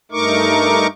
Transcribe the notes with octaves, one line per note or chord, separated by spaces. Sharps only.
G2 A3 D#4 A#4 C#6 D6